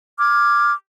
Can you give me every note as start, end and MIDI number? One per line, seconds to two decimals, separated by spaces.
0.19 0.73 86
0.19 0.73 89
0.19 0.73 92